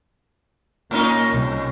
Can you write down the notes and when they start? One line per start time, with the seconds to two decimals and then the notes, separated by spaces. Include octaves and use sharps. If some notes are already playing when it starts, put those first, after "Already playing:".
0.91 A2 A#3 C#4 D#4
1.32 C2